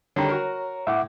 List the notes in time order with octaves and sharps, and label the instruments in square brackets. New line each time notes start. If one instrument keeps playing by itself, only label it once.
[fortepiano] D3 D#3 G3 [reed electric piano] C#5 A#5
[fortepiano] F#4 A#4
[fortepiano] A2 [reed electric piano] E5 F#5 D6